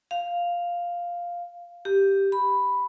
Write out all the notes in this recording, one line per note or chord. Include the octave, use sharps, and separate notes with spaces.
F5
G4
B5